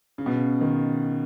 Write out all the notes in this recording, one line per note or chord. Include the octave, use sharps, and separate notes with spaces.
C#3
B2
C#3
D#3